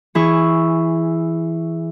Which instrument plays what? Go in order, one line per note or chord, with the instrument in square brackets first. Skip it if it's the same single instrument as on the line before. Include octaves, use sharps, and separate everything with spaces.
[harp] E3 E4 G#4 E5 C#6